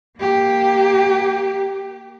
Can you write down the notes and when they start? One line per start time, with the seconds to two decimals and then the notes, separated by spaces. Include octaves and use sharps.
0.19 A#3 G4